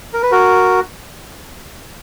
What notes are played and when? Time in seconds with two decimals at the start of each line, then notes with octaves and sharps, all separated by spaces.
0.13 A#4
0.23 B4
0.32 F#4 A#4